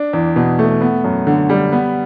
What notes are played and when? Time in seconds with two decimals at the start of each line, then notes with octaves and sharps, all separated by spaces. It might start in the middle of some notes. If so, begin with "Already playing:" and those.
Already playing: D4
0.13 E2
0.36 B2
0.59 A3
0.81 B3
1.04 F#2
1.27 D3
1.50 G3
1.72 B3